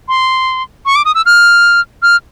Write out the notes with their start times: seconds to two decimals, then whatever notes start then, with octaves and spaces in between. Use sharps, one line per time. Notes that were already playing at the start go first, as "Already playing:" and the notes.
0.08 C6
0.86 C#6
0.95 D6
1.05 D#6
1.15 E6
1.26 F6
2.02 F6